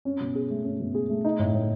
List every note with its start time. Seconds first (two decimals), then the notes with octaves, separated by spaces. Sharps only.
0.05 C#4
0.20 B2
0.35 G#4
0.50 A3
0.64 C#4
0.80 B2
0.95 G#4
1.10 A3
1.25 D#4
1.39 A2
1.54 A2